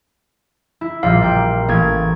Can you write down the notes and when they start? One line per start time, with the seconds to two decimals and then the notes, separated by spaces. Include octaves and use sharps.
0.81 E4
1.03 A#1 A#2 G3 F5
1.22 A#2 G5
1.69 A1 A#3 G#6